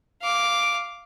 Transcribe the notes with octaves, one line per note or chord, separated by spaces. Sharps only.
F5 D6